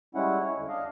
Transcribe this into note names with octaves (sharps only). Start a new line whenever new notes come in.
G3 G#3 C#4 E4 F#5
E4 C#5
E2 D3
D4 D#5 F5